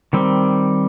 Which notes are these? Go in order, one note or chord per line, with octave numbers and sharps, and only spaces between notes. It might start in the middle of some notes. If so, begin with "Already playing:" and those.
D#3 G3 C4